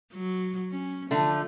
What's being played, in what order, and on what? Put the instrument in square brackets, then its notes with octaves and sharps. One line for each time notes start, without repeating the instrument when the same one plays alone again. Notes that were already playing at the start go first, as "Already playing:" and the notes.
[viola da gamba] F#3
C#4
[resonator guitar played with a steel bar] D3 A3 [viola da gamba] F3